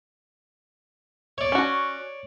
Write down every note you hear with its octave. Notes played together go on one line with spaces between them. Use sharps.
C#5 D5
C#4 F#4